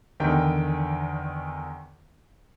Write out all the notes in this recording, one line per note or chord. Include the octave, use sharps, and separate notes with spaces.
E2 D3 D#3 A#4 G5